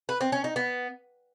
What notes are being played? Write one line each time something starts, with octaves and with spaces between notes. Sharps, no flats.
B4
C4
C#4
D#4
B3